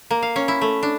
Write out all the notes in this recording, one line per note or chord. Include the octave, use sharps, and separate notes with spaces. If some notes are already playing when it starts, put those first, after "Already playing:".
A#3
F5
C#4
E4
A3
D4